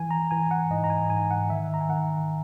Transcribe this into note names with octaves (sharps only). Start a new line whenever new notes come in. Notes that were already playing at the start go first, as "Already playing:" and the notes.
Already playing: E3 G#5
A#5
E3 G#5
F#5
G#2 D#5
A#5
G#5
G#2 G#5
F#5
D#3 E5
A#5
G#5
D#3 F#5